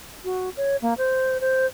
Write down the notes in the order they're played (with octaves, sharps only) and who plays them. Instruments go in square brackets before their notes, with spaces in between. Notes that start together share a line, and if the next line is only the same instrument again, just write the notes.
[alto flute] F#4
C#5
A#3
C5
C5